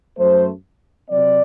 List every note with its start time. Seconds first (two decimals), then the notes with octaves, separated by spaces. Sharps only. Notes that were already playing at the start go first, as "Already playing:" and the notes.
0.18 F#2 F#3 A3 C5
1.09 C3 F#3 C4 D5